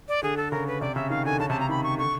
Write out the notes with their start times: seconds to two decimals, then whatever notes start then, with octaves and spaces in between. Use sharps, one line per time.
0.08 D5
0.23 D3 G#4
0.37 A4
0.51 C#3 A#4
0.67 B4
0.81 C3 D5
0.95 C#3 E5
1.10 D#3 F5
1.25 D3 G#5
1.39 C#3 A5
1.50 C3 A5
1.59 C#3 A#5
1.69 D#3 B5
1.83 C#6
1.98 D3 C#6